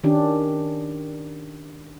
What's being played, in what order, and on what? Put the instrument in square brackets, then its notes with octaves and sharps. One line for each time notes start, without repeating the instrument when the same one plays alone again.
[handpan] D#3 C#4 D4 G4